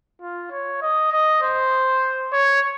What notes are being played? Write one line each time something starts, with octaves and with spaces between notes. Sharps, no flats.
F4
C#5
D#5
D#5
C5
C#5